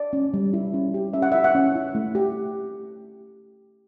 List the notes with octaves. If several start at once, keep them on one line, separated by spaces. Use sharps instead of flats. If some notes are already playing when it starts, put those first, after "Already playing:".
Already playing: D5
C#4
G3
E4
C#4
G4
C#4 E5
F#5
E4 E5
F#5
C#4
E4
A3
G4